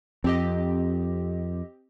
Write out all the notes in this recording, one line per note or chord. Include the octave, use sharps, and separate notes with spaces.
F2 C4 G4 D#5